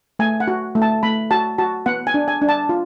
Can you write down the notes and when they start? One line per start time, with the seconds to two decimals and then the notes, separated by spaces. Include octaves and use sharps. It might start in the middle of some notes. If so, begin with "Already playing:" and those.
0.19 A3 G#5
0.40 F#5
0.48 F#4
0.75 A3
0.82 A5
1.03 A3 B5
1.31 F#4 A5
1.58 F#4 A5
1.86 B3 F#5
2.07 G#5
2.14 D4
2.28 G#5
2.42 D4
2.49 A5
2.69 F4